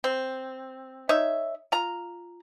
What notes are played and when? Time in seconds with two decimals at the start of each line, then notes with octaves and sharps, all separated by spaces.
0.04 C4
1.09 D#4 C#5 E5
1.72 F4 A#5